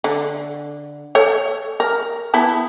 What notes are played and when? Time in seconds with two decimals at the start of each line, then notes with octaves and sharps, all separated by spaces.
0.04 D3
1.15 A4 C#5
1.80 A#4
2.34 B3 E4 A5